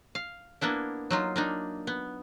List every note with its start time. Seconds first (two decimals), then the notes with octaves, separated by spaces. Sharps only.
0.15 F5
0.61 A#3 B3 D4 E4
1.10 F#3 D#4 F4
1.36 A#3 D4 D#4
1.87 B3